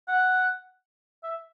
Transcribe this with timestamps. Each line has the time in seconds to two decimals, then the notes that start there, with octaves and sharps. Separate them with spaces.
0.08 F#5
1.23 E5